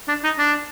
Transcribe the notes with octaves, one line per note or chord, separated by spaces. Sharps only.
D4
D#4
D4